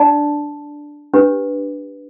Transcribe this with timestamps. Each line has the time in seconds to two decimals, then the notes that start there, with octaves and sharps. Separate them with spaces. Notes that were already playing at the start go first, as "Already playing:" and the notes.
Already playing: D4 D5 A5
1.14 D4 G4 B4